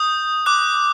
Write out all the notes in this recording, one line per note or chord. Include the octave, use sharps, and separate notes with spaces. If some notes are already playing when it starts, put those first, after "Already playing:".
Already playing: D#6 G6
D6 F#6